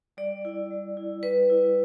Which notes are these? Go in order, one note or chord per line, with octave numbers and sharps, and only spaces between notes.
G3 D5
E4
G3
E4
G3 B4
E4